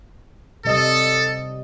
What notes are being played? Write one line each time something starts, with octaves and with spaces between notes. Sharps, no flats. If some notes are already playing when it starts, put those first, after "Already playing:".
C3 G3 A4 D#5